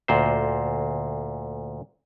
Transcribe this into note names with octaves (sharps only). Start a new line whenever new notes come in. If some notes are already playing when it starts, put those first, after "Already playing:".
D2 A#2 C5